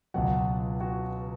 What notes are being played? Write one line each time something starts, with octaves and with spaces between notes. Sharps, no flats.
C#2 B2 F#3 F#4 F#5
F#4 F#5